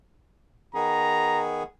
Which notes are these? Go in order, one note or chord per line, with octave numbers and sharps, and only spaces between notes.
D#3 B3 G#4 A#5